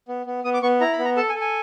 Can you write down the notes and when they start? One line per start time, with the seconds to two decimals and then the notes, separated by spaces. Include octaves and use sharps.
0.08 B3
0.26 B3
0.44 B3 D#6
0.54 D6
0.62 B3 C#6
0.81 E4 A#5
0.93 B5
0.99 B3
1.05 A#5
1.17 A4 A5
1.29 G#5
1.35 A4
1.41 G#5